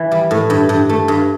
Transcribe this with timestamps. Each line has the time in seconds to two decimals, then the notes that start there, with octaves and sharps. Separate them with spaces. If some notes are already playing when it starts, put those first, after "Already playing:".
Already playing: E3
0.12 G3
0.31 A2
0.50 G2
0.69 G2
0.89 A3
1.08 G2